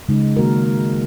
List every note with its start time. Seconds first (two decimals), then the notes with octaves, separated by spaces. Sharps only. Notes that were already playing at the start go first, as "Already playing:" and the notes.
0.09 C#3 G#3 D#4
0.37 D#3 A#3 F#4 A#4